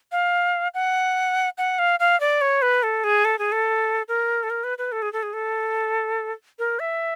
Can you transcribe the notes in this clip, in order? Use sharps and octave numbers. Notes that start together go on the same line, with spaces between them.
F5
F#5
F#5
F5
F5
D5
C#5
B4
A4
G#4
A4
G#4
A4
A#4
A4
A#4
B4
B4
A4
G#4
A4
G#4
A4
A#4
E5